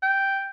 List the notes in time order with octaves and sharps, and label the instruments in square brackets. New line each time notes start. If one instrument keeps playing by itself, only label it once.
[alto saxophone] G5